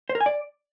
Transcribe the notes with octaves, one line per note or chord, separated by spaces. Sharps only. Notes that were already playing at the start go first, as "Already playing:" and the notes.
C5
A#4
G#5
D5